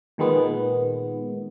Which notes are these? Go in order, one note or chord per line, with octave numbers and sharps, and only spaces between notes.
A#2 D#3 G#3 B3